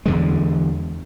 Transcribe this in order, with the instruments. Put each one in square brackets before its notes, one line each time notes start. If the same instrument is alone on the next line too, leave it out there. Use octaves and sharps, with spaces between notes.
[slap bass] E2 D3 G#3